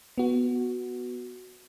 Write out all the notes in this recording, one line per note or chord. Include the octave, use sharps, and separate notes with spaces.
B3 F#4